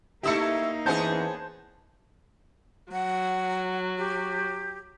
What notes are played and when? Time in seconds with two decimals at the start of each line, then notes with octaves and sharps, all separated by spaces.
0.23 A3 A#3 D#4 E4 G4 E5 E6 C#7
0.86 E3 B3 C#4 G#4 C5 A5 G6
2.92 F#3 F#5
3.98 G4